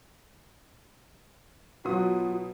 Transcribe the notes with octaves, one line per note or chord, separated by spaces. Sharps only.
B2 F#3 B3 F4 D#6